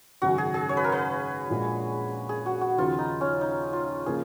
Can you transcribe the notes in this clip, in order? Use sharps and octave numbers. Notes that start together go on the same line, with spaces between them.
G#1 F#2 C#3 F#3 C#4 F#4
G#4
G#4
C#5
B4
A#4
B4
A#1 A#2 G#3
G#4
F#4
F#4
D#2 C#3 F3 F4
D#4
C#4
D#4
F4
C#3 F3 A#3 G#4